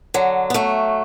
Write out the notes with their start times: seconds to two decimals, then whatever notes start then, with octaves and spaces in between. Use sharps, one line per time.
0.14 D3 F#3
0.50 B3
0.54 F#3 A3